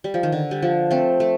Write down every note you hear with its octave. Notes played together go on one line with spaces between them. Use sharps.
G3
F3
D#3
D3
G3
F3
A3 C4
A3